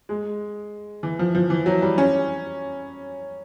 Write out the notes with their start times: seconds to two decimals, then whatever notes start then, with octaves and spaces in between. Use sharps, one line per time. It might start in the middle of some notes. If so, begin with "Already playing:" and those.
0.09 G#3
1.03 E3
1.19 F3
1.35 F3
1.50 E3
1.66 F#3
1.82 G3
1.98 C#4